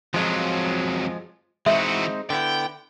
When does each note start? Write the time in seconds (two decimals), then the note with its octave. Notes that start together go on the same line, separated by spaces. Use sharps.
0.14 F2 F3 F#3 G#3 F4
1.66 E3 G#3 C4 D#4 F#4 E5
2.30 D3 B3 E4 G5